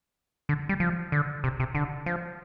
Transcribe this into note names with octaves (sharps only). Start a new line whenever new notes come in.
D3
G3
F3
D3
C3
C3
D3
F3